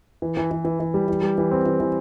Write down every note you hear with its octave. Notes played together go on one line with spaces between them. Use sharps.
E3
E3
E3
E3
E3
G3
E3
G3
E3
C4
E3
E3